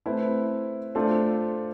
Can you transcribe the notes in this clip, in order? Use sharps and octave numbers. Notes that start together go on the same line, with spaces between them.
A3 C4 E4 B4
A3 D4 F4 A4 C5